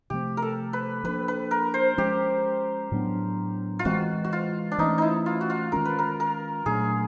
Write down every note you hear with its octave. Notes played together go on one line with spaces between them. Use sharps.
C3 F3 A3 C4 G4
A#4
A4
B4
F3 A#3 D4 B4
B4
A#4
C5
F3 G#3 C#4 G4
A2 F#3 B3 D4
F4
E3 G#3 C4 F#4
F#4
F4
D4
E3 A3 C#4 D#4
D#4 E4
F4
F#4
F4
D#3 G#3 C#4 A#4
B4
A#4
A#4
A#2 F#3 A3 D4 G#4